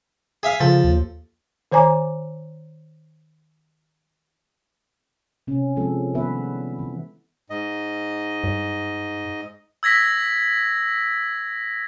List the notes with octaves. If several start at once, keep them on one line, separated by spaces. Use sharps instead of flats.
G#4 E5 F5
C#3 F3 A4
D#2
D#3 C5 C#5 G#5 A#5 D6
C3 C#4
F3 G#3 C4 A4
D#3 G3 B3 B4 E5
E3
G#2 D#5
G2
E6 G#6 A#6 B6